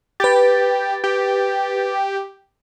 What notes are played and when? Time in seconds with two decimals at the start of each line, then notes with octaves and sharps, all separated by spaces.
0.20 G4 B4 A6
1.04 G4